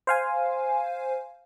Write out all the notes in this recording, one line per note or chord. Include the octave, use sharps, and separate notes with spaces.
C5 F5 G#5